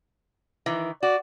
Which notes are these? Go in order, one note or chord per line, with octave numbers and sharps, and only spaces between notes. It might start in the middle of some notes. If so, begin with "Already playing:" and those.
D#3 E3
F#4 D5